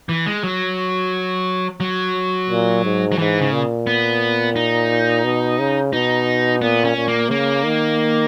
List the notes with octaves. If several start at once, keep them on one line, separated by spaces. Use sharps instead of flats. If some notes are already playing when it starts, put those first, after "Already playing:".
E3
G#3
F#3
F#3
A#2
G#2
F#3
G#2 E3
C#3
A#2
B3
D#4
B2
C#3
B2 D#4
A#2 B3
C#4
A#2
A#3
C#3 A#3
D#3